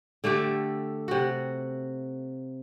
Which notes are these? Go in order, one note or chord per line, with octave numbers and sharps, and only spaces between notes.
D3 A3 D4 G4
C3 F#4